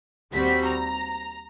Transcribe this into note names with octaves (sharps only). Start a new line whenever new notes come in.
D#2 G3 C4 F#4 B6
A#5